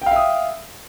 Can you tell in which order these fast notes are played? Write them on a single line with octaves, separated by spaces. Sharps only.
G5 F5 E5 D#6